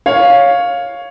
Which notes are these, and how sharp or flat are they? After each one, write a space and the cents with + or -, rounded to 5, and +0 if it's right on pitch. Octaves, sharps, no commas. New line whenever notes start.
C#5 +0 F5 +10